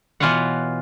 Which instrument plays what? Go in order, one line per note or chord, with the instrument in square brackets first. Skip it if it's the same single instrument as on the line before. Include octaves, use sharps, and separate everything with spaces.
[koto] B2 E3 F4 C#5 F5 F#5